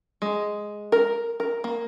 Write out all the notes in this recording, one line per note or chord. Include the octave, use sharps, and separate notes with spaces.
G#3
A#4
A#4
A#3